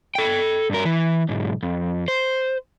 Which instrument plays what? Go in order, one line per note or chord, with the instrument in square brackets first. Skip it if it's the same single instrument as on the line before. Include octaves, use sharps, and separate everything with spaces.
[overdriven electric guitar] A4 G5
G2 A#4
E3
B1 G#2
F2
C5